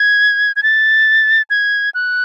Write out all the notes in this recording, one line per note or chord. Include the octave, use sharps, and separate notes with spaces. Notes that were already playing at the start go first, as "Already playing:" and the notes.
Already playing: G#6
G#6
A6
G#6
F#6